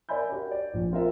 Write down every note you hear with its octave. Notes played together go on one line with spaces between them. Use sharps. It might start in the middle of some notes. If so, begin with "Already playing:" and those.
A#4 D5 E5 G#5 B5 G6
F#4 G4 A#4 C#5 D5
D5
A#1
C4 F4 A#4 E5